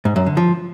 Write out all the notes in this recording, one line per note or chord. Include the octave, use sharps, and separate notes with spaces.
G#2
F#2
D3
F3